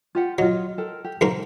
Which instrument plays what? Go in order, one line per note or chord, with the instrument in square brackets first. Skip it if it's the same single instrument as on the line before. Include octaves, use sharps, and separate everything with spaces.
[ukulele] F4 G4 F#5
[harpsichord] F#3 [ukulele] F4 D#5
[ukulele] A4 A#4 G5
G4
[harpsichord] C#2 G#2 A#4